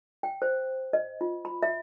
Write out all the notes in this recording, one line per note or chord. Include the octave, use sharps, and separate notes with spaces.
G5
C5
D#5
F4
B5
E5